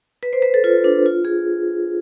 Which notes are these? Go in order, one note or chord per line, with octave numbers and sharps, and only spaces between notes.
B4
C5
B4
A4
F4
D4
F4
G#4